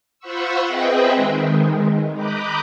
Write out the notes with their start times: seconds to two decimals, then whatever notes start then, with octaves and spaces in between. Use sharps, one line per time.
0.19 F4 C5 F#5 B5 C#6 E6
0.67 C4 G#4 B4 D#5 E5 G5
1.15 D#3 G#3
2.14 A#5 B5 D6 D#6 F#6 G6